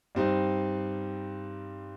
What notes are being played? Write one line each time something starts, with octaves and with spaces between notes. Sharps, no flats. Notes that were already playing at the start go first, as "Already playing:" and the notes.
G2 G3 C4 D#4